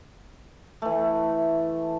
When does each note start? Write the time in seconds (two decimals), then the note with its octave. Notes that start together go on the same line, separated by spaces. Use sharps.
0.82 E3 A3